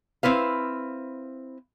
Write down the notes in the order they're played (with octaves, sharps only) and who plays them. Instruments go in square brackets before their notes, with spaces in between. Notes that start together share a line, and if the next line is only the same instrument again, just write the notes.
[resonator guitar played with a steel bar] C4 E4 B4 F5